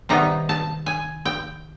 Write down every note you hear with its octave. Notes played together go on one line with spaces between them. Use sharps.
C3 D#3 G3 B3 D#4 A#5
A5
G#5
G5